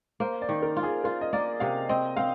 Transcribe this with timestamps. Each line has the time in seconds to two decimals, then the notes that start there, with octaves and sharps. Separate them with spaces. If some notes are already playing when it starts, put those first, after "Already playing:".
0.20 A#3 C5
0.42 D5
0.49 D#3
0.62 A#4
0.77 F4
0.83 G#4
1.04 F4 A#4
1.21 D#5
1.33 A#3 D5
1.60 C3 F5
1.89 C4 D#5
2.16 C4 F5